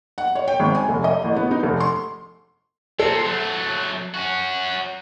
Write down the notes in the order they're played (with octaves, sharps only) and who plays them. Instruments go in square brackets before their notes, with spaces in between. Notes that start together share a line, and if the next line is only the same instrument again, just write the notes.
[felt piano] F#5
C#5
G5
G#1
G#5
F1
D#5
A1
B3
D#4
F1
C6
[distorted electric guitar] A#2 C4 [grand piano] A4
[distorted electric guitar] F#3 A3
C#4 F#4